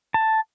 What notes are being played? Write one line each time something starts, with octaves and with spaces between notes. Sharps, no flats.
A5